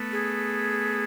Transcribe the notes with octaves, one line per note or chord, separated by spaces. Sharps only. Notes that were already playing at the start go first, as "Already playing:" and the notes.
Already playing: A3 B3
G#4